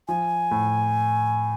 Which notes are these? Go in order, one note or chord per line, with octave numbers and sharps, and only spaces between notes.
F3 G#5
A2